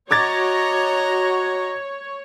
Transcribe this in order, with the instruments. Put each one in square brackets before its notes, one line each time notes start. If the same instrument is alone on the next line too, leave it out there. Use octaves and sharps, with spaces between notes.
[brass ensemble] F#4 [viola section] C#5 [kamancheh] D#5 A#5 [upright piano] D6 G#6 A6